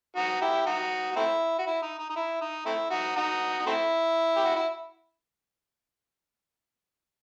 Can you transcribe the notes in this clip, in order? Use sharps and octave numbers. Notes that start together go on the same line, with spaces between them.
D#4 F#4
E4 G4
D#4 F#4
F#4
A3 C4 E4
F#4
E4
D#4
D#4
D#4
E4
D#4
A3 C4 E4
D#4 F#4
D#4 F#4
D#4
A3 C4 E4
G4
F#4
E4